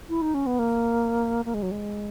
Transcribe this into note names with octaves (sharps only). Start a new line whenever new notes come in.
E4
D#4
C#4
B3
A#3
A#3
G#3
F#3
G#3